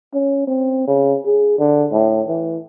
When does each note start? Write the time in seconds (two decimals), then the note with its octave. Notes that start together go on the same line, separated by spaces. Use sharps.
0.13 C#4
0.48 C4
0.87 C#3
1.25 G#4
1.58 D3
1.92 A2
2.28 E3